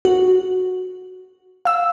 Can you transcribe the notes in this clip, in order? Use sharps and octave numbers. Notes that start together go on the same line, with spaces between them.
F#4
F5 E6